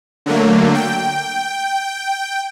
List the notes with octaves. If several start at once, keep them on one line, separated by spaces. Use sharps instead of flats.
D3 F#3 A3 A#3
G5